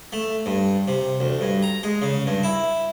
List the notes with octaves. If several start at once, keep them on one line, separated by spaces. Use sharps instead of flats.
A3
G2
C3
D2
G2
A#5
G#3
C#3
G2
E4